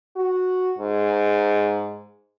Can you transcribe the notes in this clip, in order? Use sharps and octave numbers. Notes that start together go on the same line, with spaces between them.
F#4
G#2